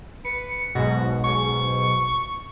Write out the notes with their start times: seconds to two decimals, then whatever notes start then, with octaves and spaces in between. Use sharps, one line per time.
0.25 B4 C#7
0.75 B1 G#2 B2 F#4
1.24 C#6